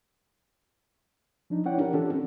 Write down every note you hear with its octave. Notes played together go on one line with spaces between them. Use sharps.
F3 D4 D#4
C#4 E4 C#5 D5 F#5 G5
D4 G4 A#4
E3 C#4 D4 F4 G4 A4
C4